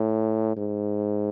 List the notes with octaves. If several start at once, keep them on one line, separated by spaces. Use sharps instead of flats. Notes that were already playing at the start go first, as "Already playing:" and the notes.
Already playing: A2
G#2